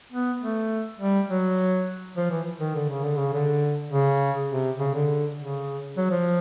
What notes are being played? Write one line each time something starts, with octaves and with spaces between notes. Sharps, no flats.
B3
A3
G3
F#3
F3
E3
D#3
D3
C#3
D3
C#3
D3
C#3
C3
C#3
D3
C#3
F#3
F3